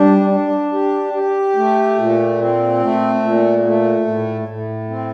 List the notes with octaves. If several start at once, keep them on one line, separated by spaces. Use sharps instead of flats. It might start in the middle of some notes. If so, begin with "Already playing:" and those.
Already playing: G3 D4
D4
G4
G4
A3
A#2
C4
A3
A#2
A3
A2
A2
C4